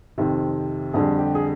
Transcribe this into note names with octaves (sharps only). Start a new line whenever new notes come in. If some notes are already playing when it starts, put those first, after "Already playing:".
F2 C3 D#3
F2 D3 G3 G#4
G4
G#4